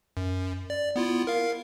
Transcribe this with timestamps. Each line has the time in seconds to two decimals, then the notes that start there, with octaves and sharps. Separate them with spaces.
0.17 F#2
0.70 D5
0.96 B3 E4 F4
1.27 A#4 F5